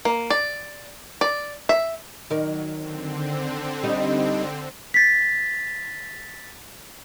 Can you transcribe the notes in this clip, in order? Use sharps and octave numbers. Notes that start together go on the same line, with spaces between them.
A#3
D5
D5
E5
D#3 F#3 A#4 D5
D3 C4
G3 D#4
A6 B6